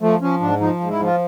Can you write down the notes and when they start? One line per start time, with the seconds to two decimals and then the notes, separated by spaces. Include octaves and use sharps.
0.01 F3 A3
0.21 F3 C#4
0.40 G#2 D4
0.60 F3 D#4
0.80 G#2
0.90 E4
1.00 F3 F4